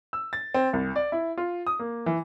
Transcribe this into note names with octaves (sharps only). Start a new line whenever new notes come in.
E6
A6
C4
C2
D5
E4
F4
D#6
A#3
E3